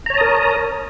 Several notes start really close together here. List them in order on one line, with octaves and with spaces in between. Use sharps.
A#5 C#5 A5 D#6 A#4